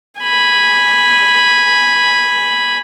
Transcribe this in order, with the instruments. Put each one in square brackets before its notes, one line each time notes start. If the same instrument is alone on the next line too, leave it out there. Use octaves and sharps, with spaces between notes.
[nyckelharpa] G#5 B5